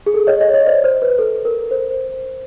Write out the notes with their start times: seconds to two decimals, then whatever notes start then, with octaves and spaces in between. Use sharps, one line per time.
0.06 G#4
0.14 A4
0.27 C#5 D#5
0.40 C#5 D#5
0.53 C#5 D#5
0.66 C5 D5
0.84 C5
1.02 B4
1.19 A4
1.45 A#4
1.71 C5